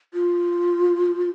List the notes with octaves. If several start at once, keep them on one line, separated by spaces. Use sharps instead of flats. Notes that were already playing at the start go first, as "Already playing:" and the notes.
F4